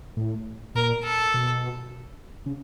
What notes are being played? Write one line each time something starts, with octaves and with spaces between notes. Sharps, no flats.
A2
A#2 A#4
A4
B2
C#3